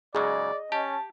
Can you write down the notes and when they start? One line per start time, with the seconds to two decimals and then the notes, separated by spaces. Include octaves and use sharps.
0.15 G#2 C#3 F#3 G#4 D5 D#5
0.72 C#4 G4 A5